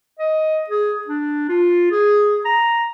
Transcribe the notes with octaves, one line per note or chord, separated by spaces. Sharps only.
D#5
G#4
D4
F4
G#4
A#5